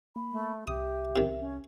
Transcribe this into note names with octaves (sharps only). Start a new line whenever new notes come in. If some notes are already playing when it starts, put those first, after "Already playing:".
A#3 B5
A3
C2 G4 E5 D#6
C3 D#3
C#4